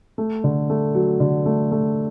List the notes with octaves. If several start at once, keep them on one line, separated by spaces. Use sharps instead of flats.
A3
D3
A3
F#3
D3
A3
A3